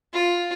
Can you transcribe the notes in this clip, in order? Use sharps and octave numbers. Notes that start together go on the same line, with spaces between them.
F4